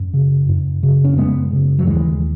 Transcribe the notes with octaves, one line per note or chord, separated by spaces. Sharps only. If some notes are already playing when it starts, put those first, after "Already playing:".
Already playing: F#2
C#3
F#2
C#3
C#4
F#2 G#3 B3
C#3
F#3
D#2 E3 G#3